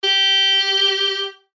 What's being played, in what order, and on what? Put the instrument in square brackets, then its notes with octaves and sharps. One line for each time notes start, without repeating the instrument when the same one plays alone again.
[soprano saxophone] G4